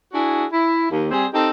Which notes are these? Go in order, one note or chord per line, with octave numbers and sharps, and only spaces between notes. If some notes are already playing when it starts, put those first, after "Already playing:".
D4 E4 F#4 G#4
E4
D#2
G3 C4 G#4
C4 D#4 G4 A4